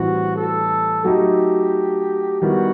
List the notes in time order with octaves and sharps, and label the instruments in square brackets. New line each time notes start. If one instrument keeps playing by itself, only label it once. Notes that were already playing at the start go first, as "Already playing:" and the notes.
Already playing: [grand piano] A2 E3 G3 C4 E4 [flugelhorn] F#4
[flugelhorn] A4
[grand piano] F#3 A3 D#4 [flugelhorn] G4
[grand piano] D#3 G3 B3 E4 [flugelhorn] F#4